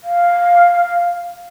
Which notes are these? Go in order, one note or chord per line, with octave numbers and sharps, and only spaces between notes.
F5